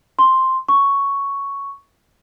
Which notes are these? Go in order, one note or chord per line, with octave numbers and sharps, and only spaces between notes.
C6
C#6